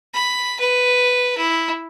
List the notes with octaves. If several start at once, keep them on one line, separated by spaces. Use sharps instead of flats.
B5
B4
E4